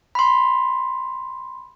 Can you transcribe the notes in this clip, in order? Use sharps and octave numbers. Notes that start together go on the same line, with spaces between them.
B5 C6